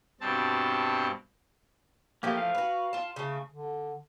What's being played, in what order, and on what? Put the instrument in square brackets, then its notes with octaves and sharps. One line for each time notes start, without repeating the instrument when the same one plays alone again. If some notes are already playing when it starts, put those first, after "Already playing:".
[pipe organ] G2 B2 C4 A5
[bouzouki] E3 F3 A3 [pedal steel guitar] A#3 G4
[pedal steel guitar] F5
[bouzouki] F#4 B4
F4 A5
C#3 A3
[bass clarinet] D3